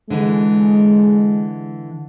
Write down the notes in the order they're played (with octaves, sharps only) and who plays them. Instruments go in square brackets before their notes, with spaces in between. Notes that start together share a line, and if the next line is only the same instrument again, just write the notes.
[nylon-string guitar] D3 E3 [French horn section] G#3